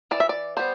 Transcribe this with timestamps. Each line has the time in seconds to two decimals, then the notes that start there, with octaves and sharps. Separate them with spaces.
0.11 E3 D5
0.20 E5
0.29 D5
0.57 G3 B3 C5